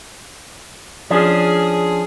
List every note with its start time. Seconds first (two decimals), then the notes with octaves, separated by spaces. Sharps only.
1.10 F3 C#4 D4 G#4